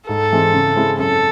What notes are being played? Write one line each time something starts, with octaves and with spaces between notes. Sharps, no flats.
G#2 A4
E3 G#3 C4
C#3
G#3 C4 E4
F#2 A4